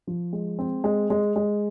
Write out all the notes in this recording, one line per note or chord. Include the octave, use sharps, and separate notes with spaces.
F3
G#3
C4
G#3
G#3
G#3